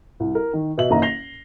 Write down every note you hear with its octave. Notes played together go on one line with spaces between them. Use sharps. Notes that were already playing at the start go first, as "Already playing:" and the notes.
C2
A#4
D#3
B2 D#5 E5 F#7
F#1 D#3 A#3 D#5 E5 A#5
A#6 C7 F7 G7